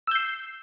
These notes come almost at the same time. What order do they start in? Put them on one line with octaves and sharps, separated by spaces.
E6 G6 C7